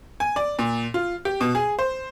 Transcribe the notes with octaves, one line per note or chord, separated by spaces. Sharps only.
G#5
D5
A#2
F4
G4
B2
G#4
C5